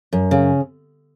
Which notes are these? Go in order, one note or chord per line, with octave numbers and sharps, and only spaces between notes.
F#2
C#3